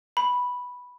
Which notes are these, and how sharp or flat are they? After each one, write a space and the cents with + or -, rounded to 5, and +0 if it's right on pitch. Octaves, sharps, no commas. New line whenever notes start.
B5 -5